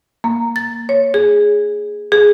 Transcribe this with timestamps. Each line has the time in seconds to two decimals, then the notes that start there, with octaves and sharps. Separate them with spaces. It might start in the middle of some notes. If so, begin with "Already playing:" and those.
0.24 A#3
0.56 A6
0.89 C#5
1.14 G#4
2.12 G#4